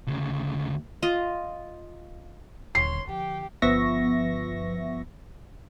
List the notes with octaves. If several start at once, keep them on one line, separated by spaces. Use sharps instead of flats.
D2 C#3
F4 D#5
D#1 D3 C#5 C6 C7
D3 F3 G4 G5
G1 F3 B3 E5 C#6 A#6